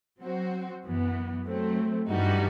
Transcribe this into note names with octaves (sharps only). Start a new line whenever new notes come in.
F#3 C4 F#4 C5
F#2 E3 B3
F#3 A3 C4
G2 E3 G3 D#4 F#4